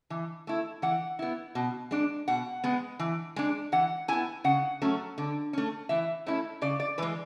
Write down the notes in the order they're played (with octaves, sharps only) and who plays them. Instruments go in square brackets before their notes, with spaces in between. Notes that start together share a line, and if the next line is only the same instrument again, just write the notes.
[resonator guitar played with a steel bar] E3
A3 E4
E3 F#5
B3 E4
B2
G#3 D4
B2 F#5
G#3 B3
E3
G#3 D4
E3 F#5
B3 E4 G#5
C#3 F#5
F#3 A3 C#4
D3
A3 C#4
E3 E5
A3 C#4 E4
C#3 D5
D5
E3 G#3 B4